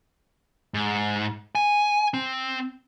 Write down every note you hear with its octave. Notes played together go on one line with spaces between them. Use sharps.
G#2
G#5
C4